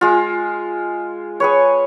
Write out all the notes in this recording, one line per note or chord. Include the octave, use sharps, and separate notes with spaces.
G#3 F4
G#4 B4 C#5